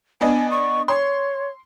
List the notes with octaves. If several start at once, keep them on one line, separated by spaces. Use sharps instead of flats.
B3 D4 D#5 G#5
C#6
C#5 C6